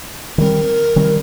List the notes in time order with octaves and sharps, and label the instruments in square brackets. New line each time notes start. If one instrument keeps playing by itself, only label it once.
[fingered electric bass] D#3 G3 C4 [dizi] A#4
[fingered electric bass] D#3 G3 C4